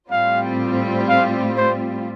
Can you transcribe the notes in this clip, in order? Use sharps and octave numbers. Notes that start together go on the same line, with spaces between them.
A2 G3 C4 F4 F5
F5
C5